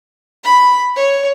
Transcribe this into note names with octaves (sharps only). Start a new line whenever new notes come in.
B5
C#5